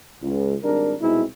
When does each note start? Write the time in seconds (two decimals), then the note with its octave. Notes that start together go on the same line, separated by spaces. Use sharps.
0.23 C#2
0.64 G#1 G3 D4 A#4
1.01 C2 B2 G#3 C4 D#4 E4